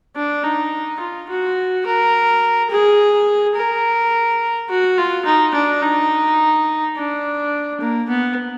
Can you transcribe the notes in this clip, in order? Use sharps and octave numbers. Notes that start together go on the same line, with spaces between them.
D4
D#4
F4
F#4
A#4
G#4
A#4
F#4
F4
D#4
D4
D#4
D4
A#3
B3